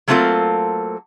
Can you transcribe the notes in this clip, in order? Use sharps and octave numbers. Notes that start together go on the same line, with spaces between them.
F#3 A3 A#3 C4 F4 A4